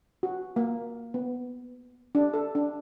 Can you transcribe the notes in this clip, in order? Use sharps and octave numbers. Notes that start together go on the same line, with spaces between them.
F#4
A#3
B3
D4
A4
D4